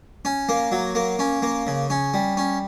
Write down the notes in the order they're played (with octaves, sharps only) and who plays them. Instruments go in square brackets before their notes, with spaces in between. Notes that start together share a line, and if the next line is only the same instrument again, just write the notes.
[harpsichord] C#4
A#3
F#3
A#3
C#4
A#3
C#3
C#4
G3
C#4